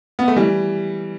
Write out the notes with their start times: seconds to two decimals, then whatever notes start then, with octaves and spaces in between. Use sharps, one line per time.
0.19 B3
0.28 A3
0.36 E3 G3